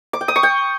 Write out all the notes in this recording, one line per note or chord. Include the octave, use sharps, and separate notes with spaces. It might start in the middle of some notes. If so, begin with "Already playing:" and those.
D6
G5
D#6
C#6
G5